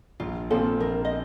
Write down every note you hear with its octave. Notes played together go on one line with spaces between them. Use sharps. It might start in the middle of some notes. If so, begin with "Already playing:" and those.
A#1 F4
A#2 F3 C4 A4
A#1 A#4
D#5